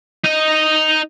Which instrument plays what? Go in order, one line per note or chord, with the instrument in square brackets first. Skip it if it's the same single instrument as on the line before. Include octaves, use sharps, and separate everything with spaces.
[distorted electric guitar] D#4 D#5